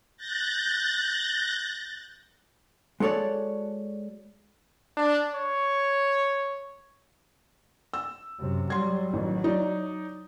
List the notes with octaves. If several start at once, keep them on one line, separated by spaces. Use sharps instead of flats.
F#6 G6 A6 A#6
G#3 F#4 A4 C#5 D5
D4
C#5
E6
F#2 C3
F#3 G3 C6 G#6
A1 D#3 F#3
D#4 D5